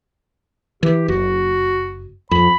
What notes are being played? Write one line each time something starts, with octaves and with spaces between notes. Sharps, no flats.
E3 G4
F#1 F#4
F2 B5